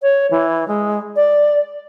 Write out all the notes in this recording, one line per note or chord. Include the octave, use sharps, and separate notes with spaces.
C#5
E3
G#3
D5